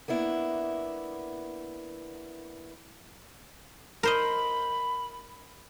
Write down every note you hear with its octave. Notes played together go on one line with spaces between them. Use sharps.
A#3 B3 D4 E4
A#4 C5 D#5 B5